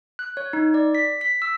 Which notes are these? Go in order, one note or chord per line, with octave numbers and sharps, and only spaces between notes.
F#6
C#5
D#4
D5
B6
B6
E6